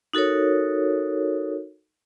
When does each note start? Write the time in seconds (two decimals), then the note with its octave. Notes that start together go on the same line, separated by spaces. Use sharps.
0.13 D#4 F#4 A4 A#4 C#5